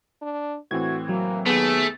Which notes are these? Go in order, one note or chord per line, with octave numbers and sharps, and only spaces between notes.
D4
A2 E3 C4 F#4 G#6
F#3 A#3
D#2 A3 B3 G#4